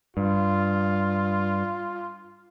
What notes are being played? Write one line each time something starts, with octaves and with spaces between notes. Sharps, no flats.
G2 F4